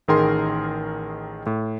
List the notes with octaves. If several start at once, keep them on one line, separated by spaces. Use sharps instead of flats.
A1 D#3 G#4 A#4 G5 C6
A2